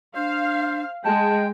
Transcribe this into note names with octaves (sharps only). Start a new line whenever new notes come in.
D4 C5 F5
G#3 D#5 G5 A5